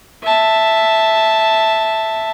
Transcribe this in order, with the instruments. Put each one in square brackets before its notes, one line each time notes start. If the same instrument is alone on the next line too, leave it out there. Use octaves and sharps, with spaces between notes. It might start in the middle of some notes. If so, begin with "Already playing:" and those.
[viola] E5 A5